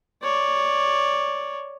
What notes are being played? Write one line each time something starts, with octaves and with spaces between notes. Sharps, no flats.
C#5 D5